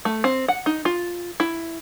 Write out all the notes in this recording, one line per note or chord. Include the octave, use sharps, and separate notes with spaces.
A3
C4
F#5
D#4
F4
E4